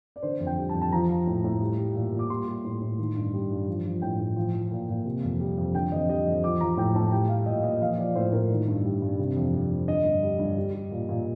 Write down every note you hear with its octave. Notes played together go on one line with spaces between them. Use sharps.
D5
D3 C5
F2
G5
G3
A5
F2
A5
F3 A#5
F3
A2
A2
G3
G3
A#2
A#2
D6
G3 C6
G3
A2
A2
D#3
G2
G3
G2
F3
F3
A2 G5
A2
F3
F3
A#2
A#2
C3
F2
G3
F2
D3 G5
F2 D#5
G3 D#5
F2
F3 D6
F3 A#5
A2 G5
A2 A5
G3 G5
G3 F5
A#2 D#5
A#2 D#5
F3 F5
F3 D5
A2 C5
A2 A#4
D#3
G2
G3
G2
C3
F2
G3
F2
D3 D#5
G2
G3
G2
G3
G3
A#2
A#2